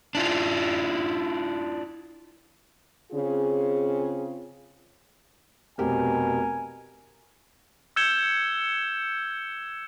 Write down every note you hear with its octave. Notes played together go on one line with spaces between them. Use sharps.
D4 E4 F4
C#3 C4 F4 G#4
F1 B2 C4 G4 A#4 G#5
E6 G6 G#6 C#7 E7 G7